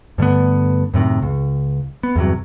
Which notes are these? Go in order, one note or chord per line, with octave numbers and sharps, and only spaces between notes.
G2 D3 A3 B3
F#2 A2 C3 D#3
C#2
B3
E2 G2 C3 F#3